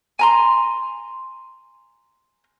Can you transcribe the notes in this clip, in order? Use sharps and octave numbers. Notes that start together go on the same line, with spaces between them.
G#5 A#5 C6